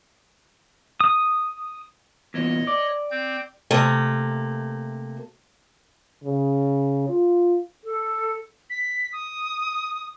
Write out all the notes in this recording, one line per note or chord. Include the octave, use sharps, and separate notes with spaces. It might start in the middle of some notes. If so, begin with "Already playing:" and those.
D#6
E2 A#2 C#5 D#5
D5
C4 G6
C3 A3 A#3
C#3
F4
A4
B6
D#6